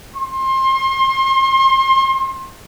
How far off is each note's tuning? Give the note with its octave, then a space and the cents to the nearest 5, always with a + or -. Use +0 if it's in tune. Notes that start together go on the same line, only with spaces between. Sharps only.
C6 +30